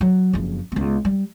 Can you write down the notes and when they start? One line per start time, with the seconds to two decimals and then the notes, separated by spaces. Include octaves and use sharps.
0.01 F#3
0.33 F#1 F2
0.72 C#2 B3
1.05 G3